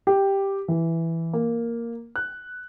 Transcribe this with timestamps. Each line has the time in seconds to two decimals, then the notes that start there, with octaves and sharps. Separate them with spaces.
0.07 G4
0.68 E3
1.33 A#3
2.16 F#6